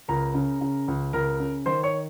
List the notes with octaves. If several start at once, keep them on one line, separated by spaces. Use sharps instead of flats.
C#2 A#4 A#5
C#3
C#3
C#2
C#2 A#4 A#5
C#3
D#3 C5 C6
C#5 C#6